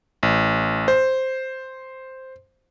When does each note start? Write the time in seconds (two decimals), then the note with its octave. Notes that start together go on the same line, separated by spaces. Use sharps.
0.23 A1
0.88 C5